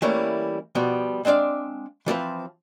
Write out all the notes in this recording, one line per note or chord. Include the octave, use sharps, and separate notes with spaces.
E3 G3 A3 A#3 C#4 E4
B2 F3 G3 B3
G#3 C4 D4 D5 F5
E3 F3 C4 B4